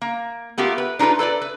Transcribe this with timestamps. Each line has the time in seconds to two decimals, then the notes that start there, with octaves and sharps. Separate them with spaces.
0.01 A#3
0.58 A3 B3 F4 G4 A#4
0.78 B4
0.99 D4 D#4 F4 A#4 B4
1.19 A4 B4 C#5 D5
1.41 B4